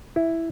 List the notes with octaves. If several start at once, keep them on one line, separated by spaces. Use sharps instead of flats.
E4